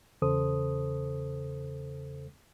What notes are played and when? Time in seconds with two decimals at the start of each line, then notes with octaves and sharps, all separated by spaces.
0.22 E2 C#3 A4 C5 D#6